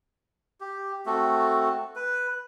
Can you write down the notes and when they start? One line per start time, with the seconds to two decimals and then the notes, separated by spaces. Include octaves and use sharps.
0.61 G4
1.06 A3 C4 F#4 A4
1.96 B4